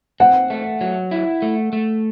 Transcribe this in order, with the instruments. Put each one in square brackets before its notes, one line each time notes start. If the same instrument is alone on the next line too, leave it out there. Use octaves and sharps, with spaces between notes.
[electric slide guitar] C4 [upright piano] F#5
[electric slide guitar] A3
F#3
E4
A3
A3